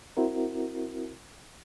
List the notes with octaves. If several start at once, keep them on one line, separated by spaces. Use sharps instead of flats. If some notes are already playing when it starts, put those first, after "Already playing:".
C4 E4 F#4 A#4